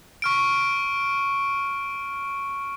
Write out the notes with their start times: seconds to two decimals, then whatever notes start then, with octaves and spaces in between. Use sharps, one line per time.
0.22 C#6 F6 D7